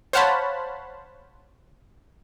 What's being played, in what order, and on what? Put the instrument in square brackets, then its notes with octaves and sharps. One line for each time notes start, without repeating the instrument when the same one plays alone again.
[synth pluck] C5 C#5 F5 F#5 A5 B5